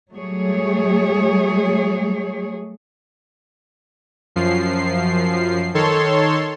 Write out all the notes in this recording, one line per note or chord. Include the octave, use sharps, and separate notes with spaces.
F#3 G3 A3 G#4 C#5
F#2 F3 C7
D#3 A4 C#5 C6